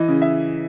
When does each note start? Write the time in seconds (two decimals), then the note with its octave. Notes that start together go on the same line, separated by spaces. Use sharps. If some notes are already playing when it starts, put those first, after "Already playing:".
Already playing: E3 D#5
0.08 C#3
0.22 E5